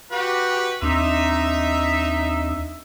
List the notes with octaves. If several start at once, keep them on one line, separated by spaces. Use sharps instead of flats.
F#4 G4 B4
D#2 C4 D4 D#4 E5